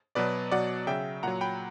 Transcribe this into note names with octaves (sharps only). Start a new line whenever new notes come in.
B2 F#3 B4 D5
B2 F#3 D5 F#5
C#3 F#3 E5 G5
A#2 F#3 F#5 A#5
G5 B5